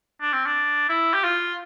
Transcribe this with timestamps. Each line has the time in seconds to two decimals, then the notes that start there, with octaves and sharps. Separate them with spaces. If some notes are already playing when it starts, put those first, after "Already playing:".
0.21 D4
0.33 C4
0.46 D4
0.89 E4
1.14 G4
1.24 F4